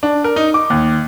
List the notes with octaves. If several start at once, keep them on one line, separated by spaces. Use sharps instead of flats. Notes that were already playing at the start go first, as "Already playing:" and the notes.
D4
A#4
D#4
D6
D#2